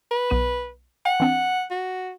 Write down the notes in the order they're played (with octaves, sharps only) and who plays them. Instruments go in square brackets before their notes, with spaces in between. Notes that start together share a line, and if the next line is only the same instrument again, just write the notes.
[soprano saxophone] B4
[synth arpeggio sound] B1 B3 D#7
[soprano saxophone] F#5 [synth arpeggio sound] G5
[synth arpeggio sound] E3 C4 D4
[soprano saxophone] F#4